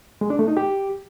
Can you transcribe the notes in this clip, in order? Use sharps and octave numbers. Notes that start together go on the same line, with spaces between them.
G#3
D4
A3
D#4
G4